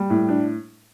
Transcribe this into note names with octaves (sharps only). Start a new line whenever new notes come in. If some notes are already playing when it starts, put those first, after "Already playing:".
Already playing: G3
A2
D4